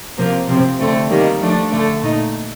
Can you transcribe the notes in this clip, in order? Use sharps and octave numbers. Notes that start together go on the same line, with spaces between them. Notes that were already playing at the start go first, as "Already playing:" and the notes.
C3 F3 A#3
C3 F3 C4
D3 A3 C4
D#3 G3 A#3 D#4
F3 A3 D4
D3 A3 D4
A#2 A3 D#4